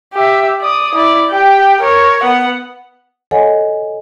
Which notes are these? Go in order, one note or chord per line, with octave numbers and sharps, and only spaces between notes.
G4 E5
D5 D#6
E4 D5
G4 G5
A#4 C#5
B3 F#5
A4 C#5 D#5 F#5 G#5